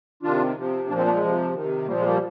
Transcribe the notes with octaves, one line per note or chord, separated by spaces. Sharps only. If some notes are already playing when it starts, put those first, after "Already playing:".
C3 D#3 D4 F4
C3 F3
A#2 F3 A#3 D4
G#3 C4
A#3 D4
G#3
C3 F3
C3 D#3
A#2 F3 G3 A#3
G#3
G3 A#3